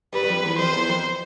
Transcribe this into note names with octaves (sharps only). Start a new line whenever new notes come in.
G2 B4
G2
F2
E2
F2 C5
E2
F2